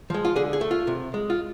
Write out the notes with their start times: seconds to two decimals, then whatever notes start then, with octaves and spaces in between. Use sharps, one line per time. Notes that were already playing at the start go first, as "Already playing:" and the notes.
0.10 F3 G#3
0.25 F4
0.36 D3 G#4
0.53 G#4
0.61 A3
0.71 F4
0.87 C3
1.14 G#3
1.30 F4